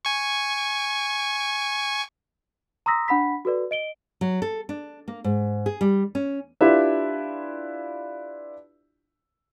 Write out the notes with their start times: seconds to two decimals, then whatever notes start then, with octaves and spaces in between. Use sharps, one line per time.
0.05 G#5 C#6
2.86 A#5 C6 D#6 E6 A#6 B6
3.08 D4 F#5 B5 B6
3.45 F#4 A4 B4 D5
3.71 D#5 D7 G7
4.21 F#3
4.42 A4
4.69 D4
5.08 A#3
5.24 G#2
5.66 G#4
5.81 G3
6.15 C#4
6.61 D4 E4 F4 G4 B4 E5